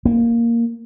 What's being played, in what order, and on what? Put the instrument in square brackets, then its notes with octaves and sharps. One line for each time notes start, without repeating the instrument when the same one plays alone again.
[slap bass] A#3